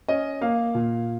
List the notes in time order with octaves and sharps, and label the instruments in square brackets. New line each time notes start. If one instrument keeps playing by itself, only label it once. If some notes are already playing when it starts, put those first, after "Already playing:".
[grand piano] C#4 D#5
A#3 F5
A#2